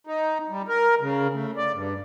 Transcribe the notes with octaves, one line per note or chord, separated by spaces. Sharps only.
D#4
G3
A#4
C#3
A3
D5
G2